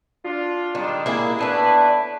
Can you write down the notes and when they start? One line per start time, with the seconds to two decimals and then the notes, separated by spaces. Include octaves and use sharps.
0.24 D4 F4
0.75 D#3 G3 G#3 D4
1.06 A#3 E4 G#4
1.39 A2 B3 D4 E4 B4